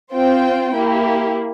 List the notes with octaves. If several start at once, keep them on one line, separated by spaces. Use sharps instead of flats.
C4 F4 C5 G5
A#3 E4 G4